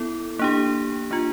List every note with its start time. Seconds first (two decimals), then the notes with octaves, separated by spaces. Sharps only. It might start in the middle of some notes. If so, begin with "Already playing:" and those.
Already playing: B3 E4 A4
0.39 A#3 D4 G4
1.11 A#3 D4 F4